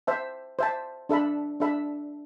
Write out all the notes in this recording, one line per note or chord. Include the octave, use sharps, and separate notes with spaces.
C5 E5 A5
C5 E5 A5
D4 A4 E5 B5
D4 A4 E5 B5